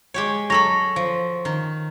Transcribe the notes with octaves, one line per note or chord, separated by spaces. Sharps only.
G#3 G4 C#5
F#3 A4 B5 C#6 A#6 F7
F3
D#3